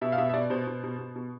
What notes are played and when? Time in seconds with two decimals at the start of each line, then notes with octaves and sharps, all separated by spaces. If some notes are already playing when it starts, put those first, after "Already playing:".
0.01 B2 E5
0.12 F5
0.18 B2 E5
0.29 E5
0.33 B2 D5
0.50 B2 C5
0.67 B2
0.83 B2
0.99 B2
1.16 B2